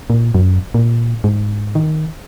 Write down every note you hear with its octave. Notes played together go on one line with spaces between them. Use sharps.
A#2
F#2
A#2
G#2
D#3